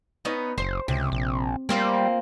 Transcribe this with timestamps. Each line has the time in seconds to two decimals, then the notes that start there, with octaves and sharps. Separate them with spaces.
0.25 B3 C#4 D#4
0.58 F#1 C5
0.88 C#2 C3
1.12 A#1
1.69 G3 A#3 C4 F4